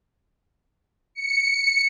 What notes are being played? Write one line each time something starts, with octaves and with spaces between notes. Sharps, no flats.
C#7